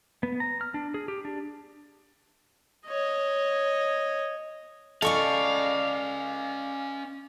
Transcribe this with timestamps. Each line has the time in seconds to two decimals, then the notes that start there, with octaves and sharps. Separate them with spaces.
0.23 B3
0.40 A#5
0.61 F6
0.74 D4
0.94 G#4
1.08 G4
1.25 D4
2.87 C#5 D#5
5.02 C#4 A4 D5 D#5 F5 G#5 C#6